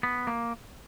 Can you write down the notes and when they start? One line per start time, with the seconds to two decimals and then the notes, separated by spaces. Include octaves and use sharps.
0.03 B3
0.27 A#3